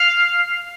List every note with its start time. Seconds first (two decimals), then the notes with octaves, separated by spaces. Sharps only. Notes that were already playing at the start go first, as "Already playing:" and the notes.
Already playing: F5